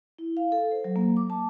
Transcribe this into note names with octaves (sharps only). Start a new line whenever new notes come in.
E4
F5
A4
C5
F#3
A#3
D6
A5